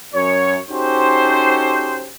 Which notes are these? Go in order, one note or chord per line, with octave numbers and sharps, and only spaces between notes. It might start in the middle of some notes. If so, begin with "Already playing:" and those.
F#2 C#5
C#4 D#4 F#4 G4 A4 C5